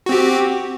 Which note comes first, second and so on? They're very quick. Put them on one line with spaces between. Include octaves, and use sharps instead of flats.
F#4 C4 G4